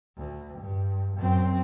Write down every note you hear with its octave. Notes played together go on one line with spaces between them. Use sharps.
D2
G2
F#2 C4